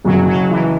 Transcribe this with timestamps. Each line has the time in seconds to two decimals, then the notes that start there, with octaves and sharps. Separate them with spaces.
0.04 F#1 F#2 C#3 F#3
0.28 F#3
0.50 E3